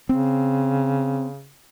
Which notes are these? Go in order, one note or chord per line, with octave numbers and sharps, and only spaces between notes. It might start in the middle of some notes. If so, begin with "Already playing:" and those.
C#3 C4